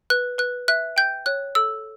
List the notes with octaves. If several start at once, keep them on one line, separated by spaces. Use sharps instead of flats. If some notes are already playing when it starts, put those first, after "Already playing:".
B4 F#6
B4 F#6
E5 F#6
G5 G6
C#5 F#6
A4 E6